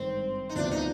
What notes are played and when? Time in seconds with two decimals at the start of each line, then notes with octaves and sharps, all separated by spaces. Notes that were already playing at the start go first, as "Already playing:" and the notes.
Already playing: G#1 G2 D#3 C4
0.49 D#4
0.55 D2 C3 F3 B3 D4 F4
0.71 D#4